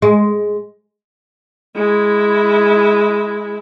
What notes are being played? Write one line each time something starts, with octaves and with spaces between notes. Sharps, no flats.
G#3
G#3 E4